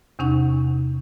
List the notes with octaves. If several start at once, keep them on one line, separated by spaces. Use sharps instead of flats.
E2 C3 C#4 D#4 F#5 C#6